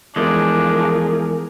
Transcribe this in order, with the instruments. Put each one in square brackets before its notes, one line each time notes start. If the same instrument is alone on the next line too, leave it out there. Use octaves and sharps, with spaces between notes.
[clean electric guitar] E2 G#3 [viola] F3 A3 [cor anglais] D4 [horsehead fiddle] G#4 A#4